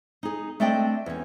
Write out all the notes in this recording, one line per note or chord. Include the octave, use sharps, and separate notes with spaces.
D#4 G#4
A3 C4 D4 D5 D#5 G5
E2 C#4